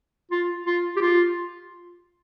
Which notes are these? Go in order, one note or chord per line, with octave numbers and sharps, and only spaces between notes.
F4
F4
G4
F4